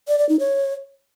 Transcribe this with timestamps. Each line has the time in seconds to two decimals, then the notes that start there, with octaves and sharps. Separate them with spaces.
0.08 D5
0.19 D5
0.29 D#4
0.40 C#5